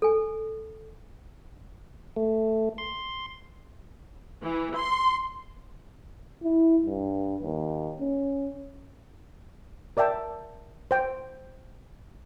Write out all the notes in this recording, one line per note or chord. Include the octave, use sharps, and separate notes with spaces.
A4 G#5
A3
C6
E3
C6
E4
G2
D#2
C#4
A#4 D5 E5 G5 A5
C5 G5